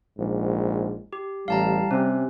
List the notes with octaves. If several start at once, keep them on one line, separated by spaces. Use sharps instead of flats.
A#1 G#2
G4
A1 G3 F5 A5 A#5
C3 C#4